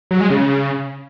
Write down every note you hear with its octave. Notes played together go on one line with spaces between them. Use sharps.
F#3
G#3
C#3